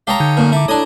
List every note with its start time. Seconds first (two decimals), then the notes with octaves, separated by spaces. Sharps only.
0.07 G4 C#5 F5 A5 A#5 D#6
0.20 D3 D#4 G6
0.37 F#2 A#2
0.52 E4 A5 A#5 D6
0.68 D4 E4 A4 C#5 D#6